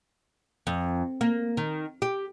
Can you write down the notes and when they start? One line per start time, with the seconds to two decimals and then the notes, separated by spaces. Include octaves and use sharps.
0.67 F2
1.21 A#3
1.57 D#3
2.02 G4